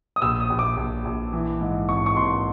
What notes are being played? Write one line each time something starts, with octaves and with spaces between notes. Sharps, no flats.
D#6
A#1 E6
D#6
A#1
D6
A#1
A#1
E3
G#2
G#1 C#6
C#6
G#1 C6